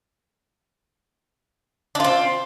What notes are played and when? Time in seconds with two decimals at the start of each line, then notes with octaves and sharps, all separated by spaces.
1.95 D4
2.00 F4
2.04 C4